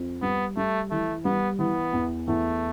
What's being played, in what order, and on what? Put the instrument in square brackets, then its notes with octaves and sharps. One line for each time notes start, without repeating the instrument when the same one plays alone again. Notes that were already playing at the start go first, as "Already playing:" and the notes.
Already playing: [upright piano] F2
[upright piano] G3 [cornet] B3
[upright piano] G3 [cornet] A3
[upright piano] E3 [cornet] A3
[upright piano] G3 [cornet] B3
[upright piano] E3 [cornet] B3
[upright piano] E2
[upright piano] E2 [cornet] A3